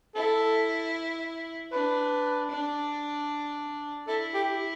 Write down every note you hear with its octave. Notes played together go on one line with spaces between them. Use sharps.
E4 A4
D4 B4
D4
E4 A4
G4